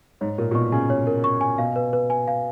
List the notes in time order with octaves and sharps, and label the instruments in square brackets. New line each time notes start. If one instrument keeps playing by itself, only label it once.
[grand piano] G#2 [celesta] C#5
[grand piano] A#2 [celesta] A#4
[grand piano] A#2
[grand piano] B2 [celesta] C#6
[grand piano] C#3 [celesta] G#5
[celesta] C#5
A#4
C#6
G#5
[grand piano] B2 [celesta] F5
[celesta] B4
B4
G#5
F5